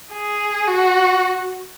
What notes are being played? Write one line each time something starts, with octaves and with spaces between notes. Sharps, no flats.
G#4
F#4